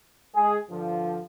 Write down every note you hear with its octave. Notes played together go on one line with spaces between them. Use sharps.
G#3 G#4
G2 D3 F3